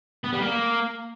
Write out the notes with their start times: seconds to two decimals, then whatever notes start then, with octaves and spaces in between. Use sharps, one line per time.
0.24 B3
0.33 G3
0.42 A#3